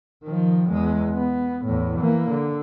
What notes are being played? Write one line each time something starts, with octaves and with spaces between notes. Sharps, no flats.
D#3 F3
E2 G#3
B3
E2 A2
E3 A#3
D3